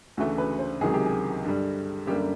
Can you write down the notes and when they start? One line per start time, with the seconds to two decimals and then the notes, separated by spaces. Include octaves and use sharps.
0.17 D2 C#3 E3 A3 F#4
0.38 B4
0.59 C5
0.81 C#2 C3 D#3 F#3 G#4
0.94 G4
1.06 G#4
1.44 G2 D3 G3
2.07 F#2 D3 G3 A#3 G4